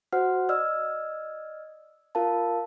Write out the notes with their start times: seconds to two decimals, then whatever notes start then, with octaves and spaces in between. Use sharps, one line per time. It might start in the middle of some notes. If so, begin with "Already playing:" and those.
0.13 F#4 C5 F#5 F6
0.49 D5 D#5 E6 F6
2.15 F4 A#4 F5 A5